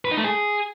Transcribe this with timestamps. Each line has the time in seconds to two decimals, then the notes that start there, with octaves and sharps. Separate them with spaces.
0.05 B4
0.11 D#4
0.18 A3
0.24 G#4